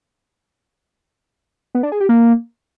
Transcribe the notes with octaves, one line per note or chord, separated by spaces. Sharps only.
B3
D4
G#4
G4
A#3